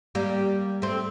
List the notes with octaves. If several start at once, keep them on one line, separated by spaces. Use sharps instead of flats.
G3 A#3
A3 C4